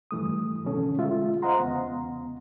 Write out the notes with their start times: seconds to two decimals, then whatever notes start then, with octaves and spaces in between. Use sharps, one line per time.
0.11 G2 E3 A3 D#6
0.64 B2 D3 E3 C#4 A4
0.98 G#3 F4 E5
1.42 C5 D#5 F5 F#5 A#5 C6
1.59 E2 C#3 B3